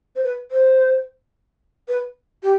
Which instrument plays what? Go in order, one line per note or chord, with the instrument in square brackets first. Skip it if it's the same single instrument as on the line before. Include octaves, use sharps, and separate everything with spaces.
[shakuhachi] C5
B4
C5
B4
G4